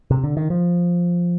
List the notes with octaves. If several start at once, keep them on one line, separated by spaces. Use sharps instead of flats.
C3
D3
D#3
F3